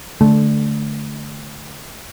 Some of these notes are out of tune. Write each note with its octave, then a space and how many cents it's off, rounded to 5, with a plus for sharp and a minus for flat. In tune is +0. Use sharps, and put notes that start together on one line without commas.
D3 +0 A3 -15